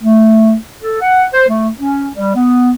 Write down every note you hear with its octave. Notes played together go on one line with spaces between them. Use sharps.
A3
A4
F#5
C5
A3
C#4
G3
B3